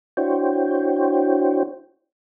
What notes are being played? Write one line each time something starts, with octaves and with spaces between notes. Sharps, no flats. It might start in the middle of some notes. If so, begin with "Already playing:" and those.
D4 E4 F#4 C5 C#5 G5